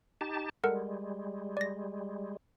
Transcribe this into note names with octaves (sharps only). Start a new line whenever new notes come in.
D#4 G4 A5
G3 G#3 A4 A#4 F#5
D5 A#6